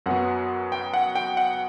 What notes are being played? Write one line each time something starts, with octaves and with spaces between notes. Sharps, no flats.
F#2 F#3 B3 F#5
G5
F#5
G5
F#5